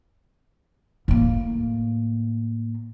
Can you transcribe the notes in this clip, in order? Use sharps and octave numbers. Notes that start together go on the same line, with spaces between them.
A2 A#3